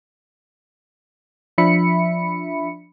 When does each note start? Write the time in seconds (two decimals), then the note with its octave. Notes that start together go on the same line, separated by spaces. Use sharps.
1.58 F3 D4 E5 B5 C#7